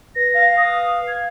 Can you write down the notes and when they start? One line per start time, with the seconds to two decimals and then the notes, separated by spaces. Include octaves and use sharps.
0.16 B4 A#6
0.35 F5
0.57 D#6
1.08 G#6